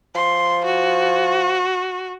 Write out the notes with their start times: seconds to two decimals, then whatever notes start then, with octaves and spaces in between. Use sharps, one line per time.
0.15 F3 C6
0.65 F#4